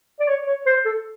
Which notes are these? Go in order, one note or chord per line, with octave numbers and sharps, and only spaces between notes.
D5
C#5
C#5
C5
A4